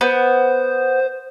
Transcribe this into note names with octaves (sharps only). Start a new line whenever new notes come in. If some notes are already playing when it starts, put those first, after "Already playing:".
B3 C5